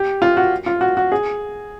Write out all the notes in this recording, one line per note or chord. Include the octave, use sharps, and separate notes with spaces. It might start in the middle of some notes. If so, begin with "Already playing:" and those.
Already playing: G4
F4
F#4
F4
F#4
F#4
G#4